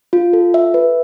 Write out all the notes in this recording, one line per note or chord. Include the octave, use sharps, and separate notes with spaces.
F4
A4
E5
B4